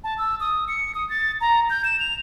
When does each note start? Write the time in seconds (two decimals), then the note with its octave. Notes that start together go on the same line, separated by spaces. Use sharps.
0.04 A5
0.18 E6
0.40 D#6
0.68 C#7
0.95 D#6
1.09 A6
1.41 A#5
1.70 G6
1.85 E7
1.99 F7